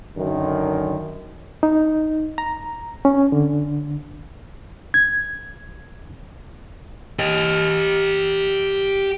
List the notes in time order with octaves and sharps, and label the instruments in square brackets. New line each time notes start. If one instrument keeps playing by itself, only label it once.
[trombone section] F#2 D3 D#3
[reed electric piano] D#4
A#5
C#4
D3
G#6
[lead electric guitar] G4 D#5